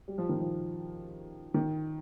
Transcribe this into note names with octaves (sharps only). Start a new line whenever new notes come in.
G3
F3
D#3
F3
D#3